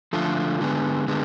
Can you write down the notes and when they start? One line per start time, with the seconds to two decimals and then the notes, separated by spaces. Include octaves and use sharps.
0.13 D3 F3 A3 F4
0.61 D3 G#3 B3
1.08 D3 G#3 B3